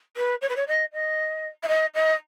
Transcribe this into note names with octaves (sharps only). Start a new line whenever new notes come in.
B4
C#5
B4
C#5
D#5
D#5
E5
D#5
D#5